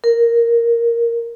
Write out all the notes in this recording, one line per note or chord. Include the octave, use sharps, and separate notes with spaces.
A#4